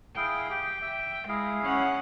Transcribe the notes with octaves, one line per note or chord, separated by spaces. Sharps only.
E4 G#4 F5 G5
G4
E5
G#3 E4 G#4 F5
C#4 F#5